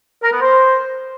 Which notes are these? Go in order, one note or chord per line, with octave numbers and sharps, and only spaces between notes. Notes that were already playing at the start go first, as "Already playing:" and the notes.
A#4
B3
C5